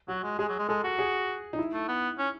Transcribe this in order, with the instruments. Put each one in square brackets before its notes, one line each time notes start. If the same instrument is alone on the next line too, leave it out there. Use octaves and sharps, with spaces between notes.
[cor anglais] F#3 [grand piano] F#4
[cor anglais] G#3
[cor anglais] G#3 [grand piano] G#4
[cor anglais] F#3
G#3
[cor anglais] G#3 [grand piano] A4
[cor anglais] F#4
[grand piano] G#4
D#4
E4
[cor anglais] A3
B3
C#4